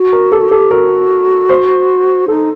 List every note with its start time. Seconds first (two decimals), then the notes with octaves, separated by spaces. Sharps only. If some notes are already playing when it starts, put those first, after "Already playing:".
Already playing: F#4
0.12 A#4
0.32 G4 A4
0.41 F#4
0.49 G4 A4
0.71 F#4 A#4
1.49 C5
2.28 D#4 A4